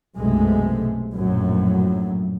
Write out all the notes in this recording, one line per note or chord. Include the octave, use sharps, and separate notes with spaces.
B1 F#2 C3 G#3 A3
A#1 F#2 A2 F#3